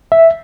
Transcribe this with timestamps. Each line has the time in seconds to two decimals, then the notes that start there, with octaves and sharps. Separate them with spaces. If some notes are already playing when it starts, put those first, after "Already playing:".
0.12 E5